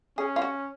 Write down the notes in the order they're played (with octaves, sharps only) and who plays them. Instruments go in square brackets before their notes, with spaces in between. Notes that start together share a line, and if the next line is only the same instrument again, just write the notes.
[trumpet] C#4 [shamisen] G#4
[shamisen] F4
F#4